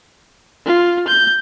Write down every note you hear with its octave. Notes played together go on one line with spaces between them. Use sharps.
F4
G6